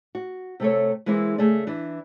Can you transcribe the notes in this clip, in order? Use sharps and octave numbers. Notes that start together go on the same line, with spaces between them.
F#4
C3 A3 A4 C#5
E3 G#3 A#3 C4 E4
C#3 A3 G#4 D5
E3 D4